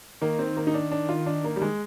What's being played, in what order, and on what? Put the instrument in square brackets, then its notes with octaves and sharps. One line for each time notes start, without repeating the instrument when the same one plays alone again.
[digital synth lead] D#3 [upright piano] A#3
[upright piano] C4
A#3
D#4
D4
D4
F4
D4
A#3
G3
G#3